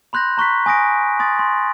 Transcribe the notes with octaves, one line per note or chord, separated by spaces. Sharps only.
B5 C6 F#6 G6 A#6
A#5 C#6 F#6 B6
G#5 D#6 A#6 D7
C6 D#6 A6
C6